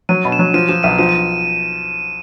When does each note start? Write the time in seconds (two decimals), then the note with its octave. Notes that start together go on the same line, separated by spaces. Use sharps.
0.09 F#3 D#7
0.25 B2
0.32 E7
0.39 F#3
0.54 F3 D#7
0.69 F3 E7
0.83 B1 D#7
0.99 F3 D#7
1.09 D#7